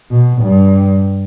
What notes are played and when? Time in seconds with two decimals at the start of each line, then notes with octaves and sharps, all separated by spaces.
0.11 B2
0.42 G2